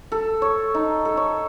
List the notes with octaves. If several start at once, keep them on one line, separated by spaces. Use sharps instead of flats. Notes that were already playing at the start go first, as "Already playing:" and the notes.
A4
C#5
D#4
A4
C#5